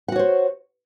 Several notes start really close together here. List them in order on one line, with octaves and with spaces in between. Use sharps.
F#5 F#4 C#5 C5